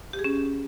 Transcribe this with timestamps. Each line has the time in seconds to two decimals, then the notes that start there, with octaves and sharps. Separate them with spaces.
0.13 G4
0.19 G#4
0.24 C#4